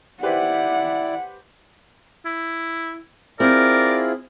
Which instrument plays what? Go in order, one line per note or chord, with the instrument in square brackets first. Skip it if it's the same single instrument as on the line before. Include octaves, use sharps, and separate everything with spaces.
[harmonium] E4 D5 [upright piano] G4 B4 C5 [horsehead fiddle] F#5
[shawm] E4
[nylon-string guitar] C4 [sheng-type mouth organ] E4 F4 G#4 [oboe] A#4 [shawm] D5